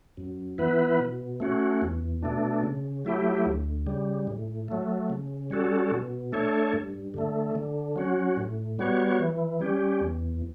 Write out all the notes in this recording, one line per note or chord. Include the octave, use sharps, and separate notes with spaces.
F#2
E3 B3 E4 B4
B2
A3 C#4 F#4
E2
B2 A3 D4
C#3
F#3 A3 E4 G4
D2
C#3 G3
A2
F#3 A3
C#3
G3 C#4 F#4 A4
B2
A3 D4 A4 C#5
G2
D3 A3
D3
F#3 C#4 F#4
A2
G3 B3 F#4 C#5
E3
G3 C#4 G4
E2